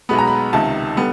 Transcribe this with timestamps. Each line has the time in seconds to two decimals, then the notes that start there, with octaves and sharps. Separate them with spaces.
0.09 B1 B2 G#3 B3 B5
0.18 A#5
0.27 B5
0.53 C#2 C3 D#3 A5
0.97 D3 G3 B3